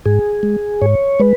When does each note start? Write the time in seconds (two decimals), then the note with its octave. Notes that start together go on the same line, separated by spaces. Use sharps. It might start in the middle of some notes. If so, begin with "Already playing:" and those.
0.05 G#2 G#4
0.43 G#3
0.81 G#2 C#5
1.20 G#3 B4